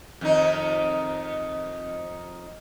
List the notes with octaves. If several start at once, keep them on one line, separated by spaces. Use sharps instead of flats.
F2 D#3 D#4